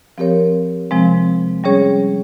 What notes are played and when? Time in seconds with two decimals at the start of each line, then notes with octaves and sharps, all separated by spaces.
0.18 F3 C4 G4 A#4 C#5
0.91 C3 F3 G#3 C4
1.64 G3 C#4 G#4 C#5